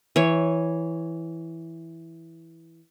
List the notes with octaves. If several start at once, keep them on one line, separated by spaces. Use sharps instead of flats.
E3 C#5